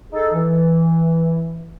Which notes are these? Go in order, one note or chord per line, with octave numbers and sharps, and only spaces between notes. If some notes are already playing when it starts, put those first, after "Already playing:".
D#4 G#4 A4
E3